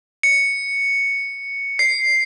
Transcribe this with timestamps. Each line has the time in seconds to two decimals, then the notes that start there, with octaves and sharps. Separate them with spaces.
0.23 C#7
1.79 C7